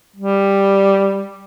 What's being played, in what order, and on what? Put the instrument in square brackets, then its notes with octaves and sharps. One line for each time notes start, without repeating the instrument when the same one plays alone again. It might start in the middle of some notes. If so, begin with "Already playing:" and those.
[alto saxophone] G3